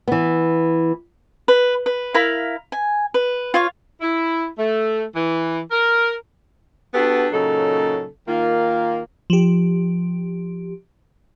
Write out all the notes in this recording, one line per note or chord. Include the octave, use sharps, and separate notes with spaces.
E3 B3
B4
B4
E4 A#4 F5 B5
G#5
B4
F4 C#5 F5
E4
A3
E3
A#4
B3 D4 F#4 G4 A4 B4
A#2 C#3 F#3 D#4 A4
D#3 A#3 F4
F3 G4